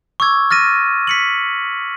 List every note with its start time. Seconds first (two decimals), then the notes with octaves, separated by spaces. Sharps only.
0.20 C#6 D6 E6 G#6
0.51 F6 A6 A#6 D#7
1.07 B6 C#7 F#7